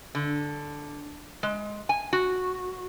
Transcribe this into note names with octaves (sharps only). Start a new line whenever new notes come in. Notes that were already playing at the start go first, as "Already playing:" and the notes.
D3
G#3
G#5
F#4